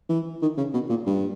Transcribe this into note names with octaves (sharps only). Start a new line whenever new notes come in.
E3
D#3
C#3
B2
A#2
G2